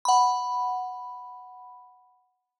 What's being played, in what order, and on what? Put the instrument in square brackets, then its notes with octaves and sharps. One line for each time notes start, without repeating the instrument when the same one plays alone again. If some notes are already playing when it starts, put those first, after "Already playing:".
[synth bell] F#5 B5